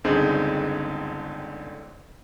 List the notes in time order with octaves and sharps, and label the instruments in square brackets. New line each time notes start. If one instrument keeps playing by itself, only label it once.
[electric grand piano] G1 C#2 D3 C4 D#4 G#4